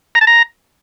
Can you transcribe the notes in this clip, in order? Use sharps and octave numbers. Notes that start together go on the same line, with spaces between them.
A#5
A5
A#5